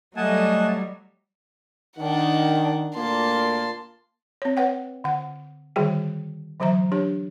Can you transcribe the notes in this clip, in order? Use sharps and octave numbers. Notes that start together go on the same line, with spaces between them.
F#3 G3 A3 D#5 F#5 G#5 A5
D#3 D4 F#5
D2 A#2 A#3 A5 C6
C4 C#5
B4 C#5 F#5 G5
D3 F#5
D3 D#3 G3 F#4 G#4 G5
D3 E3 F#3 C5 E5 A#5
D4 G4 C#5